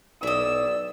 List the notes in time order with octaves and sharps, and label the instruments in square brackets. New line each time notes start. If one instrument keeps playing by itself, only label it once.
[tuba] B1 [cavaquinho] E4 D#5 [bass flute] D5 [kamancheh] E6